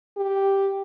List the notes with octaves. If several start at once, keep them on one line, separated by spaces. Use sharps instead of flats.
G4